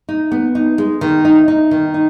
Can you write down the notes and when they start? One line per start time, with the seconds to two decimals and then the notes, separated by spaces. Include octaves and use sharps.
0.09 D#4
0.31 B3
0.55 D#4
0.78 G#3
1.01 D#3
1.25 D#4
1.48 D#4
1.71 D#3
1.94 D#4